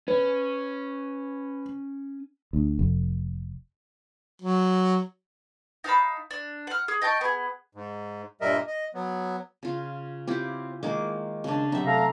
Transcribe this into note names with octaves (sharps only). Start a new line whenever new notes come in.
C#4 B4
D2
F1
F#3
D#4 F5 A5 B5
D4
F#5 F6
G#4
D#5 G5 A5 C#6
B3 G#4
G#2
G2 A#2 G3 A#4 D#5 E5
D#5
F#3 B3
C#3 F4
C4 E4 F4 G4
D#3 G#3 A#3 G#4 D6
C#3 D4
F#2 C3 D#4 E5
A3 F5 A#5